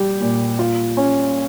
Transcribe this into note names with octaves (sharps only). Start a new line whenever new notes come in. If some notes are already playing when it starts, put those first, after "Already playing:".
Already playing: G3 G4
A#2
F4
C#4